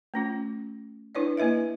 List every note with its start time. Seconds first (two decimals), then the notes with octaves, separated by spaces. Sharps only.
0.14 A3 C#4 F4
1.15 D4 E4 B4 C#5 D5
1.37 A#3 E4 B4 D#5 E5